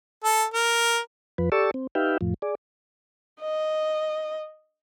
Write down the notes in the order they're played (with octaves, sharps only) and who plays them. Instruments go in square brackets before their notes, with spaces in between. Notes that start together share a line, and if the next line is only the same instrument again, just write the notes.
[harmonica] A4
A#4
[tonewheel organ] F2 F3 B4
G4 A4 D5 A5 C#6 E6
C4
D#4 G4 B4 E5 F5 G5
F2 A2 F3
G#4 D5
[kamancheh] D#5